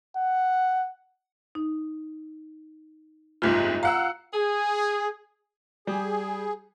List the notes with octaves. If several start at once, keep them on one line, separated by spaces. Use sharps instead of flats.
F#5
D#4
F#1 C2 G#2 F4
F5 F#5 A#5 E6
G#4
G3 G#4